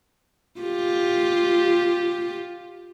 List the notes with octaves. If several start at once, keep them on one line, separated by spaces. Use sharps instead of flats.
F4 G4